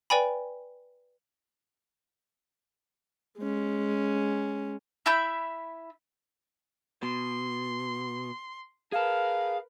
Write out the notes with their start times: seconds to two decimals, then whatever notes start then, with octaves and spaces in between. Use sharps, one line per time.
0.10 B4 D5 G5 G#5 B5
3.39 G#3 C#4
5.06 E4 E5 B5 G6
7.03 B2 C6
8.92 G#4 A#4 B4 F5 A5